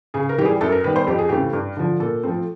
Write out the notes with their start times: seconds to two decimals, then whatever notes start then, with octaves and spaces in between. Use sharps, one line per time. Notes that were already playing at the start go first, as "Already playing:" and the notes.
0.14 C#3 G#4
0.29 A#4
0.38 E3 G4
0.42 G3 G#4
0.61 F#2 A4
0.72 A#4
0.84 D#3 G3 B3 B4
0.96 C5
1.07 F2 G4
1.18 G#4
1.29 C#3 E3 A3 C4 G4
1.53 G2
1.77 D3 F3
2.00 A#2 A4
2.23 F3 A3 C4